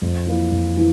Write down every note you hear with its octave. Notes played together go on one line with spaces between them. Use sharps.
F2
E3 A#3 E4
F2
E3